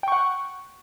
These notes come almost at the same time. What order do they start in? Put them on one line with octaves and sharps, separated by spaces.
G5 C#6 F#5